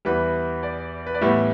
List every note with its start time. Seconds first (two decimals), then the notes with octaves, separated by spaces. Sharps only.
0.05 E2 E3 G3 B4
0.63 D5
1.06 B4
1.14 D5
1.21 A2 E3 G3 B3 E5